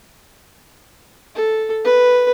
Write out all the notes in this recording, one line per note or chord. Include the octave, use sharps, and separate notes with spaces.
A4
B4